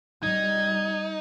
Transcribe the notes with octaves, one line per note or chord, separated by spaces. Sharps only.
G3 D#4 G#6